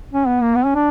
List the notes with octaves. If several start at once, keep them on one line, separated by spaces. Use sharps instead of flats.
C#4
B3
A#3
B3
C#4
D4